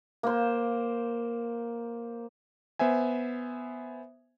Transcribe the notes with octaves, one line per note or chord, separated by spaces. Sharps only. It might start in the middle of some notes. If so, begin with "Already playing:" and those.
A#3 C5
B3 C5 E5 G#5